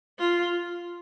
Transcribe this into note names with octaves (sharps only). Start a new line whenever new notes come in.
F4